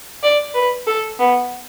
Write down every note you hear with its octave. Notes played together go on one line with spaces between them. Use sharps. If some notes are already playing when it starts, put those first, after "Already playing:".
D5
B4
A4
B3